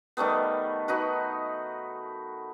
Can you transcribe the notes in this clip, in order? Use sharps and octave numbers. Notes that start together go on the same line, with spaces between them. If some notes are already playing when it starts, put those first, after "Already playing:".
D#3 G3 A3 B3
D#4 F#4 B4